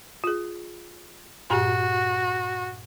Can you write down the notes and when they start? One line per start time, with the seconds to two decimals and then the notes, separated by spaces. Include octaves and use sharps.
0.24 F4 G#4
1.50 G2 A#2 F#4 G4